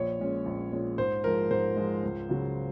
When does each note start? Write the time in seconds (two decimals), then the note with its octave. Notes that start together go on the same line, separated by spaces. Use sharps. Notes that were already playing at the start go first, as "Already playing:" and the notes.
Already playing: A#1 C#5
0.20 A#2 G#3 C#4
0.46 A#1
0.72 A#2 G#3 C#4
0.98 G#2 C5
1.24 F3 G#3 A#4
1.51 G#2 C5
1.76 F3 G#3
2.04 C#2
2.29 C#3 F#3